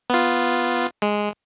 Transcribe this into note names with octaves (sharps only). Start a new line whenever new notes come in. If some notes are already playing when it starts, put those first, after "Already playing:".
B3 F4
G#3